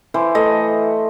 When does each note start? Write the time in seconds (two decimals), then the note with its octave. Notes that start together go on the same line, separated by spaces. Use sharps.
0.14 E3 C5
0.35 A3 D#5